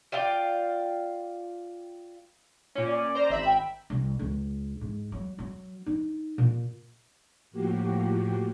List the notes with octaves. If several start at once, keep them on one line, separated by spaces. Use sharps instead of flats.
F4 D5 F5 G5
A#2 C#4
D5
C5 A#5
G#1 E5 B5
G5
C2
C#2
G#2
F#3
F#3
D#4
A#2
A2 F3 A#3 F#4 G4